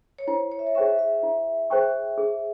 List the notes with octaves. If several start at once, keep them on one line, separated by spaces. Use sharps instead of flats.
C#5
E4 C5
C#5
E5
C#5
G#4 C5 E5 G5 C#6
E5
E4
G#4 C5 G5 C#6
G#4